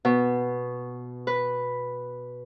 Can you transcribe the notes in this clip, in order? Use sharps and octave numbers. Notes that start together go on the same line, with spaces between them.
B2
B4